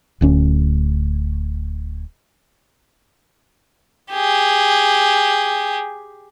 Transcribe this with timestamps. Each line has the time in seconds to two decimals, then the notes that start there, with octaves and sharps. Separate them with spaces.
0.21 D1 D2 C#4
4.12 G4 G#4